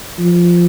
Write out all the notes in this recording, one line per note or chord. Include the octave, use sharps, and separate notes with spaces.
F3